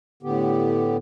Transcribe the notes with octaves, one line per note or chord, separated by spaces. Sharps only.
A2 D3 B3 G4